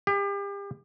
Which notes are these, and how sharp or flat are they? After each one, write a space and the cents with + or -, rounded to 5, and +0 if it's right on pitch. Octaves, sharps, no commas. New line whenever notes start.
G4 +35